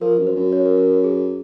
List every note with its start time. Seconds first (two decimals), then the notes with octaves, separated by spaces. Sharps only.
0.01 F3 A#4
0.18 F#2
0.27 C5
0.36 F#2
0.52 C#5
0.66 A#4
0.78 A#4
1.04 G#4